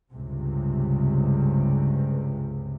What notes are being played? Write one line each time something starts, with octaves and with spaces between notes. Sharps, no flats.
C#2 G2 C3